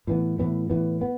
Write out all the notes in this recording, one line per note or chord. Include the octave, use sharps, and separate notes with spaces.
A2 E3 B3
A2 E3 B3
A2 E3 B3
B3